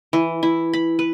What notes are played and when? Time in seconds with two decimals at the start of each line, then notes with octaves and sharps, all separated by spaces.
0.13 E3
0.43 E4
0.73 B5
0.99 B4